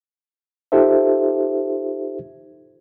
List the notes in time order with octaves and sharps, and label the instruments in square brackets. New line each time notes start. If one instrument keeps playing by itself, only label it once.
[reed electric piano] D#4 F4 G4 A4 C5 E5